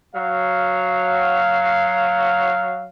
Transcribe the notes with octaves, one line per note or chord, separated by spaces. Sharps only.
F#3 F5